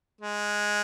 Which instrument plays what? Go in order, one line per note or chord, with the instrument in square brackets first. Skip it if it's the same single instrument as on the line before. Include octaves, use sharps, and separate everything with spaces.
[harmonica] G#3